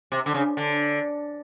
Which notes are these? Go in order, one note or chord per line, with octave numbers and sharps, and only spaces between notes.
C3
D3
C#3
D3